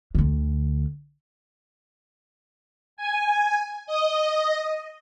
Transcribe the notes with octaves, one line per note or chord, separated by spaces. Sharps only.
D2 D3
G#5
D#5